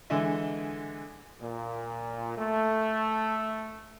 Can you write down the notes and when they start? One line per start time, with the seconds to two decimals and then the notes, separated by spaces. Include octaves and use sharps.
0.10 D3 E3 G#3 D#5 E5
1.39 A#2
2.36 A3